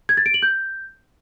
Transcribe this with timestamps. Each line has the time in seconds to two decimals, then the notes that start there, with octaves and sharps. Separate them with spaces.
0.09 G#6
0.17 A6
0.26 D7
0.34 F#7
0.42 G6